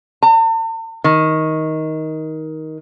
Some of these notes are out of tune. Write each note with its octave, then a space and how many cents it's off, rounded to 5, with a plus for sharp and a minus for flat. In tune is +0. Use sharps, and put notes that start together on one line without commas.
A5 +45
D#3 +15